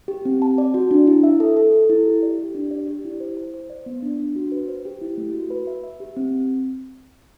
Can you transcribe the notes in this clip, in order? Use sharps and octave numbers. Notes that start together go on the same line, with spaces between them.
G4
C4
A5
D5
F#4
D4
E4
E5
A4
A4
A4
E4
G4
D5
G4
D4
D5
G4
E4
C5
C5
C5
D5
B3
D4
D4
F#4
B4
C5
G4
E4
A3
F#4
B4
E5
E5
G4
C4